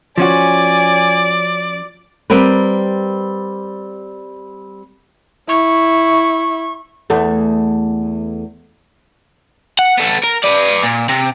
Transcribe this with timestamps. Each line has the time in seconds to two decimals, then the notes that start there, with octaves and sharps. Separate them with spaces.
0.18 F3 C#4 F#4 D5 G#5
2.30 G3 C4 G4 A#4 B4
5.49 E4 C#6
7.10 E2 A3
9.79 F#5
9.97 B3 A4
10.23 A#4
10.44 B4 D5
10.83 A#2
11.09 C3